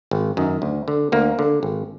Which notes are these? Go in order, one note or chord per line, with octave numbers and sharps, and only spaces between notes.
G#1
F#2 D#3
D2
D3
D2 A#3
D3
G#1